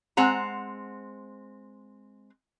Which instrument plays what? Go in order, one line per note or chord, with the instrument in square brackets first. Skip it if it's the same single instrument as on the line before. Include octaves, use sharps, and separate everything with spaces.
[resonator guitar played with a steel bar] G#3 C4 F#5 A#5